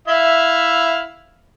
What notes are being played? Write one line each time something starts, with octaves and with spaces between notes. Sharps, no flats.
E4 E5 F5